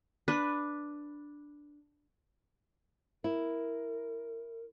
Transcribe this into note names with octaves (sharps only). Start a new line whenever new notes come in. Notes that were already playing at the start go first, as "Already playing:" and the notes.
D4 B4
E4 A#4